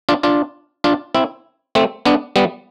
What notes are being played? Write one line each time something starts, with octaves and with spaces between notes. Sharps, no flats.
D4 F4
D4 F4
D4 F4
C4 E4
A3 C4
B3 D4
G3 B3